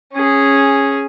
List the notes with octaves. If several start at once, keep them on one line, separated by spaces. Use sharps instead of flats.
C#4 G#4